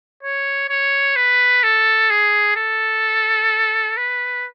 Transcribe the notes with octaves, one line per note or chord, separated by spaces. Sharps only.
C#5
C#5
B4
A4
G#4
A4
B4